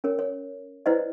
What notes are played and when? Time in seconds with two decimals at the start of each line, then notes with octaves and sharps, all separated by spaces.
0.04 C#4 A#4 C#5
0.19 C#5
0.86 E4 B4 C5 D5 D#5